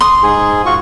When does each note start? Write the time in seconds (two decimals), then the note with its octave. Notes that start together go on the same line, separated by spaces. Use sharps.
0.01 C6 D#6
0.23 G#2 G#4
0.66 F4 F#4 C#6